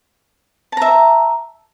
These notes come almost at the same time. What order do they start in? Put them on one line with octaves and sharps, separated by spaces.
A5 A#5 E5